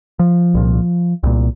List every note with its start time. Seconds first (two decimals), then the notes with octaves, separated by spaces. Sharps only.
0.19 F3
0.54 C2 A#2
1.23 C2 A#2